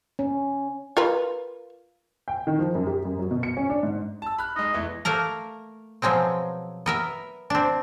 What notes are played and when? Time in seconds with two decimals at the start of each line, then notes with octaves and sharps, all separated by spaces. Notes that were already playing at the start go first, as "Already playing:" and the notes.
0.19 C#4
0.97 F4 A#4 B4
2.28 G5
2.47 D#3
2.59 F3
2.75 F#2
2.87 G4
3.05 F#2
3.19 F#3
3.31 B2
3.43 C#7
3.57 C#4
3.70 D4
3.83 G#2
4.22 A5 E6
4.38 B5 F6 F#6
4.56 G#3 D#4 D#5
4.74 E2 E3 A3
5.05 A3 A#3 A#4 A#5
6.02 B2 F3 F#3 G#3 C4
6.86 B3 A#4 E5
7.50 C4 D4